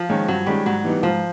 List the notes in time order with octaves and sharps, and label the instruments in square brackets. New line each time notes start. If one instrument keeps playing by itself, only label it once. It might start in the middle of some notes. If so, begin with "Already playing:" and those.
Already playing: [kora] F3
[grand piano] D#3 G#3 C#4
[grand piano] G2 [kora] F#3
[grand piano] D#3 G#3 C#4 [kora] G3
[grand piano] G#2 [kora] F#3
[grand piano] E3 G3 B3 D#4
[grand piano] G#2 [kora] F3